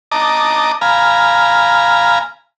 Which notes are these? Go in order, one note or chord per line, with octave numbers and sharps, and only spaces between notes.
D#5 A5 A#5 D6
F5 G#5 A#5 B5